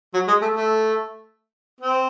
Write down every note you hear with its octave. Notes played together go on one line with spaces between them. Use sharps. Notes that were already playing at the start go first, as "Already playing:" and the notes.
F#3
G#3
A3
A3
C4